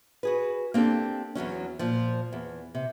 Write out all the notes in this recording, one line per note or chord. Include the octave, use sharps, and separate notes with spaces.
F#4 G#4 B4
A#3 C4 D4 G4 A4
E2 G2 F#3 C#4
A#2 F3
E2
C3